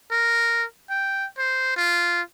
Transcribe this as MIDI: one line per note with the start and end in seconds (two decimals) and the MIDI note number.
0.11 0.65 70
0.90 1.26 79
1.38 1.72 72
1.77 2.21 65